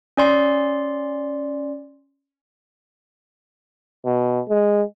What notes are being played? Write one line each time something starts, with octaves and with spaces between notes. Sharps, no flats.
C#4 D5 C6
B2
G#3